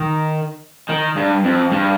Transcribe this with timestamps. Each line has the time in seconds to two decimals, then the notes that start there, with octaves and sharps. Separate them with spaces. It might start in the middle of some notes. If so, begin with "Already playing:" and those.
Already playing: D#3
0.89 D#3
1.17 G2
1.44 F2
1.72 G2